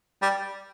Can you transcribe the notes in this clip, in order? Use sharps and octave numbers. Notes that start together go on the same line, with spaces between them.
G3